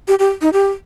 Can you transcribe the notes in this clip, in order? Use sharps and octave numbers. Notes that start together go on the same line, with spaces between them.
G4
G4
D#4
G4